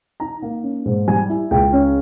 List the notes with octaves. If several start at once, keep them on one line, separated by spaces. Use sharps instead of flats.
D#4 A#5
A#3
C#4
G#2
G3 G#5
E4
C#2 G5
C#4